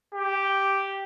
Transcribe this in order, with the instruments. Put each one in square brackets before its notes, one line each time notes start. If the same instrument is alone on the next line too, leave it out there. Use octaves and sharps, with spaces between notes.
[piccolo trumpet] G4